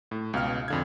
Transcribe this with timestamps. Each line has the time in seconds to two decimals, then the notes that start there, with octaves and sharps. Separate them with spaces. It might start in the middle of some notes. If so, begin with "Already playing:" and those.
0.11 A2
0.33 C#2 B2 F5 F6
0.68 F2 D3 G#6